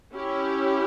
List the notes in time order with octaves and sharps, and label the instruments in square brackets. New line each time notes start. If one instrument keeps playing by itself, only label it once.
[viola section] C#4 E4 G4